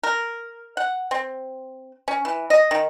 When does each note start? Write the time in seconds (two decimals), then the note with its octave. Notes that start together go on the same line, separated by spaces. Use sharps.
0.03 A#4
0.77 F#5
1.11 C4
2.08 C#4
2.25 E3
2.50 D#5
2.71 D#3